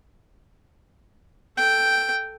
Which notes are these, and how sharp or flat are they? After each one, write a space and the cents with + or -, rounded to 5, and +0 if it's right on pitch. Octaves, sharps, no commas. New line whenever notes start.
A4 +0 G5 +0